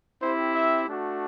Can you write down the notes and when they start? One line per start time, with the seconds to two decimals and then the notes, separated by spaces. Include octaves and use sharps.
0.21 C4 E4 G4 C5
0.54 E5
0.88 A3 D4 F#4